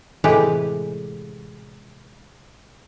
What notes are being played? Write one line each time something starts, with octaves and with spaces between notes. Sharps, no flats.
A2 C3 E3 G#3 G4 B4